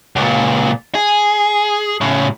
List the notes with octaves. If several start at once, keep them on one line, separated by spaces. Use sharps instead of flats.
C#2 A#2
G#4
A2 C#3